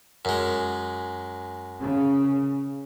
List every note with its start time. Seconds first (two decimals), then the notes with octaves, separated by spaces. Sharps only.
0.25 F#2 G#3
1.81 C#3